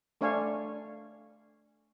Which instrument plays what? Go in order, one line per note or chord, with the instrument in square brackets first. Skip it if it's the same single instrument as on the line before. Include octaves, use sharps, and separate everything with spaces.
[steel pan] A3 D4 C#5 F5 G#5